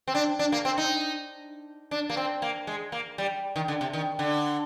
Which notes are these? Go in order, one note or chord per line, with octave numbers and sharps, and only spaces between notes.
C4
D4
D4
A#3
C4
D#4
D4
A#3
C4
A#3
G#3
A#3
G3
D#3
D3
C3
D#3
D3